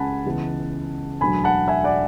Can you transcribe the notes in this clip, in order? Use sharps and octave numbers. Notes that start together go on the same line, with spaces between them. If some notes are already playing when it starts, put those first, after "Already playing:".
Already playing: C#2 C#3 F#5 G#5 A5 B5
C#2 C#3 E3 G#3 B3
E1 D2 D3 F#3 G#5 B5
F#5 A5
E5 G#5
D5 F#5